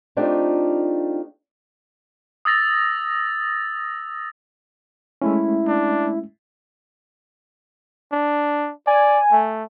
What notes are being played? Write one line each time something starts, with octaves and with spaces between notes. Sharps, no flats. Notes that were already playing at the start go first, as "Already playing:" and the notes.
A3 C4 D4 D#4 F4 G4
D#6 E6 A6 A#6
G#3 A3 C#4 E4
D4
D4
D5 G#5
A3